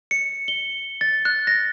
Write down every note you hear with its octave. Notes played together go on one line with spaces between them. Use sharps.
C#7
G7
A6
F#6
A#6